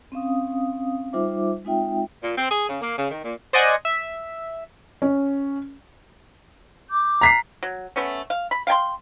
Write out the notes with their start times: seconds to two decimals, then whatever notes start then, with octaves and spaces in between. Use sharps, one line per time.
0.12 C4 C#4 F5 D#6
1.13 G3 D#4 F4 C5 E5 D6
1.65 G#3 C4 D#4 F4 E5 G5
2.24 A#2
2.38 C4
2.51 G#4
2.70 C#3
2.82 A#3
2.98 C#3
3.11 D#3
3.24 A#2
3.53 C5 D5 D#5 F#5 G#5
3.85 E5
5.02 C#4
6.90 D6 G6
7.21 A#5 B6 C7
7.63 F#3
7.96 A3 B3 C#4
8.30 F5
8.51 B5
8.67 F5 G5 G#5 C6